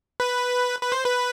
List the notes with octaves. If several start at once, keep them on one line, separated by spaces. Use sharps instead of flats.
B4
B4
C5
B4